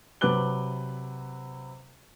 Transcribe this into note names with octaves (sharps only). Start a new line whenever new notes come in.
C3 F#3 B4 D6 F#6 G7